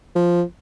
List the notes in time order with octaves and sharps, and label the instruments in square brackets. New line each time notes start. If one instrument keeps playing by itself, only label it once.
[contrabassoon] F3